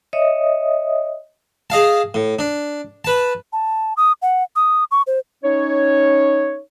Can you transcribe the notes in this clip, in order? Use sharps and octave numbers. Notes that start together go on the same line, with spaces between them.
C#5 D#5 E5 D#6
G#4 D#5 F5 A5
A2
D4
B4 A5
A5
D#6
F#5
D#6
C#6
C5
C#4 D#4 C#5